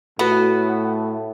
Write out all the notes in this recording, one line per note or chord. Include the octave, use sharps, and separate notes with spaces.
A2 A3 B3 F#4 A4 B4